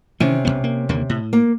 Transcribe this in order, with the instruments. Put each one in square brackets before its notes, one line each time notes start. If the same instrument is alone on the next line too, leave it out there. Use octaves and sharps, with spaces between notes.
[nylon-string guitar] C3 C#4 [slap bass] D#3 E3
[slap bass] B1 F2 B3
A#3
D#2 D3 A#3
A2
[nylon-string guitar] A#3